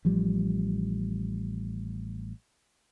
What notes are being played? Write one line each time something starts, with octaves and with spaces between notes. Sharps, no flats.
A1 F3 G3